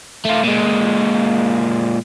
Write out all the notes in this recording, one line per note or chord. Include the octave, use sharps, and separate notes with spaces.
A3 F4
A#2 G#3